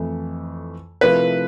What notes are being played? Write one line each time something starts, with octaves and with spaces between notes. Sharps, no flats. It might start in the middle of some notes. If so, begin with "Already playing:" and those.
Already playing: F2 E3 A3
C3 F3 A3 E4 B4